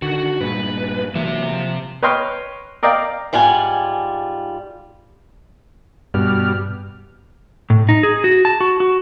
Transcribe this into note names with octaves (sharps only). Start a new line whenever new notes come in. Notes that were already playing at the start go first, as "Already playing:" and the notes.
D3 D#3 F#4
G2 A#2 G#3 B4
C3 E3 F#3 A#3 E5
F3
B4 C#5 D#5 G5 C6 F6
A#4 D5 D#5 F5 G5
G#2 G3 F4 F#5 G#5
G2 B2 G3 F6
A2
D#4
G#4
F#4
A5
F#4
F#4